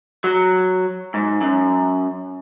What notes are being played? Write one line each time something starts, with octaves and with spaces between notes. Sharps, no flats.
F#3
G#2
F#2